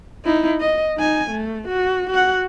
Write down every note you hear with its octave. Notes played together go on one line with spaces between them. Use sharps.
D#4 E4
D#5
D#4 G#5
A3
F#4
F#4 F#5